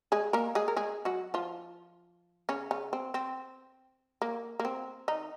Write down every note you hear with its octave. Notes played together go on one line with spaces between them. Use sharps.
G#3 G#4
A#3 A#4
G#3 G#4
A#4
G#3 G#4
F#3 F#4
F3 F4
C#3 C#4
C#3 C#4
C4
C4
A#3
A#3
C4
D#3 D#4